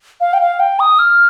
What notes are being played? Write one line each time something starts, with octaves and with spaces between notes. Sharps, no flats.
F5
G5
F5
G5
D#6
F6